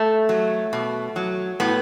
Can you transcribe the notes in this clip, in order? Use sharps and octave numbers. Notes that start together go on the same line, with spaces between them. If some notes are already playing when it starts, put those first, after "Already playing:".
Already playing: A3
F#3
B2
F#3
A2 B3